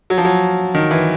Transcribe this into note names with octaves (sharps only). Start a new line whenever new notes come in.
F#3
F3
F#3
D#3
E3